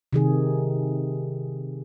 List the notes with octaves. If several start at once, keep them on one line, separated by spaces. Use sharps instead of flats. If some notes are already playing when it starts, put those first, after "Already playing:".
C3 D#3 G#4